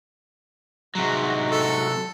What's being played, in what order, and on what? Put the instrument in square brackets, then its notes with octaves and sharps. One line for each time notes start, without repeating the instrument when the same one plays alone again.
[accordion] G#2 F#4 [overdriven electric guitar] C3 F#3
[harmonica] A4